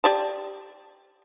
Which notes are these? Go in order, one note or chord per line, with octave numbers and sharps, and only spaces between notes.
G4 D5 A5